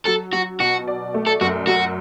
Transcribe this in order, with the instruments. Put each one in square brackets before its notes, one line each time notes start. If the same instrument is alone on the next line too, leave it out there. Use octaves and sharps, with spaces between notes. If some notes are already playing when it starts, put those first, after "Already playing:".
[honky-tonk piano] F#3 [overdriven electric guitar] A4
[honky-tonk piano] F#3 [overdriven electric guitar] F#4
[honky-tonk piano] B2 [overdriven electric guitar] F#4
[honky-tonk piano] D5
A3
[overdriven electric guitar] A4
[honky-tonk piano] F#2 [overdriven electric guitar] F#4
[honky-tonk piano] F#3 [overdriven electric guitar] F#4